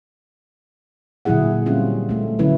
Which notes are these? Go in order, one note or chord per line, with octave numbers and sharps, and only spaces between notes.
A#2 D3 F#3 E4 G#4 F#5
G3 C4 C#4 F4
G#3 A3
D3 F#3 C#4 E4 B4